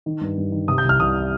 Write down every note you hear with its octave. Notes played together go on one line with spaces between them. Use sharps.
D#3
G2
G2
D#3
C3 D#6
G6
C2 F6
C2 D#6